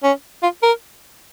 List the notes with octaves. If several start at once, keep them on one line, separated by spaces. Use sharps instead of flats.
C#4
F4
A#4